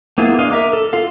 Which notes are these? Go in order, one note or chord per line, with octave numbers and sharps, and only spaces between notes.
A#3 B3 E4 F4 G#4
D4 D#5 F5
A#4 E5 A#5 D6
A4
F4 A4 F5